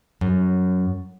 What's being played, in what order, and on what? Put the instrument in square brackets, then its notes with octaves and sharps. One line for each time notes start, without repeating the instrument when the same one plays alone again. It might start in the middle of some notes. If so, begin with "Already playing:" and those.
[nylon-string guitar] F#2